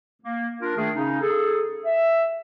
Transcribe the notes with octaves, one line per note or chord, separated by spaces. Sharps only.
A#3
D4 F4 A#4
D#3 A3 D4 G#4
C#3 C#4 D#4
G#4 A4
E5